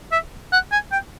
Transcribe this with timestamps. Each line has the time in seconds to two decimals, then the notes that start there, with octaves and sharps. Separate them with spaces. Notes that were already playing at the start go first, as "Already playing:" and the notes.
0.12 E5
0.52 F#5
0.72 G#5
0.92 G5